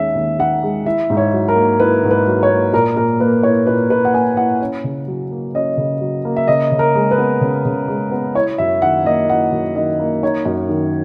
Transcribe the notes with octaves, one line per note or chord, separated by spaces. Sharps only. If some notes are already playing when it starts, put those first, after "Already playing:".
Already playing: D#2 D#3 G#3 C#4 E5
D#2
D#3 F#5
G#3
E4 E5
G#2
C#5
F#3
A#4
A#3
E4 B4
G#2
B4
F#3
C#5
A#3
A#2 A#4
A#2 A#4
A#3 B4
E4 C#5
A#2 B4
A#2 B4
F#5
A#3 G#5
E4 F#5
C#4
C#3
F#3
A#3
C#4 D#5
C#3
F#3
A#3
E5
C#3 D#5
C#3
A#4
G#3
B4
B3
C#3
C#3
G#3
B3
E4 C#5
F#2 E5
D#3 F#5
A#3 D#5
E4 F#5
F#2
D#3 D#5
A#3
D#4 C#5
F#2
D#3